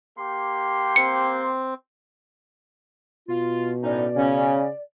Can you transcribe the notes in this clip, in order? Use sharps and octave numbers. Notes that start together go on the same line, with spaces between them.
A#3 G4 C6
C4 C#7
B2 F4
A2 C#4 D#4 D5
C#3 C#4